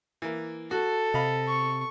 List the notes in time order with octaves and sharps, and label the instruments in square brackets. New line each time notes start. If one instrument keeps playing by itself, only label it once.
[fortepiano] E3 A#3
[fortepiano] F#4 [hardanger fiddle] A4
[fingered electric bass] C3 [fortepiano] D#5 F5 B5
[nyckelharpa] C#6